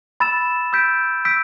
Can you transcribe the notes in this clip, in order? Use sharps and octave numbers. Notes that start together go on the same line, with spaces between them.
B5 E6 A6 E7
E6 G6 B6 D7
E6 G6 B6 D7